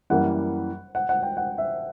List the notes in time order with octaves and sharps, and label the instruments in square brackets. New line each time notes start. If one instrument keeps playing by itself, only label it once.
[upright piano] F#2 E3 G3 A#3 [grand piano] F#5
[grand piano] F#5
F#5
G5
F#5
E5